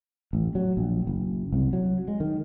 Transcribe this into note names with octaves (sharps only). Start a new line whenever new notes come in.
A1
F#3
A#1
F#1
C2
F#3
G#3
D#3